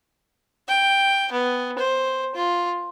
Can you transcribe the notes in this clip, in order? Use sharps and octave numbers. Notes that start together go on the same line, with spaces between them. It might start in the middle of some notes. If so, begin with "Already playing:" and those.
G5
B3
C5
F4